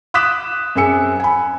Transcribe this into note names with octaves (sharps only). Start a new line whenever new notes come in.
D6 D#6 F#6 B6 E7
F#2 C4 G#4 E6 C#7
G#5 B5